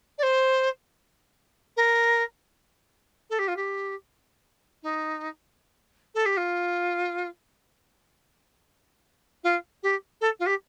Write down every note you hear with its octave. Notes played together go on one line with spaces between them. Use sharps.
D5
C5
A#4
A4
G4
F4
G4
D#4
A4
G4
F4
F4
G4
A4
F4
G4